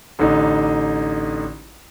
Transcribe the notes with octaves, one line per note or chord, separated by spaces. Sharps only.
A1 D3 D#4